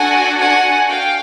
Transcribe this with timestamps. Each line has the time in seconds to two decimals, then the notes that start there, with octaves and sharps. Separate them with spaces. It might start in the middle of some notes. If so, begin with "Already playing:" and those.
Already playing: D4 F#4 A4 F#5 G#5
0.40 F#5 G#5
0.89 F5 G5